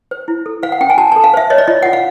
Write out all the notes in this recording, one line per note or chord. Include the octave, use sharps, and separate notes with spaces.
C5
E4
A4
C5 F5
F#5
C#4 G5
G#5
F#4 A5
A5
A4
F5
C5 E5
C#5 D#5
D5
F4 D#5
F4 F#5
F5